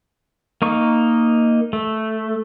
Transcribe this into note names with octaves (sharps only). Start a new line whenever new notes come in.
A#3 D#4 C#6
A3